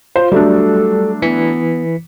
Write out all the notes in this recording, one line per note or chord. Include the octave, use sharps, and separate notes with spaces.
F4 C5
F#3 G3 A3 D4 A4
E3 B3 B6 C#7